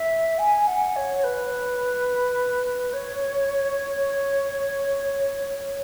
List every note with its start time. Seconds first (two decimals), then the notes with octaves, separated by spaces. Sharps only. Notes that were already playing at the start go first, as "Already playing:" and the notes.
Already playing: E5
0.38 G#5
0.67 F#5
0.96 C#5
1.17 C#5
1.24 B4
2.93 C#5